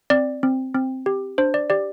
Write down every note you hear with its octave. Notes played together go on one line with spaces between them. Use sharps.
C4 D5
C4
C4
G4
D4 C5
D5
G4 D5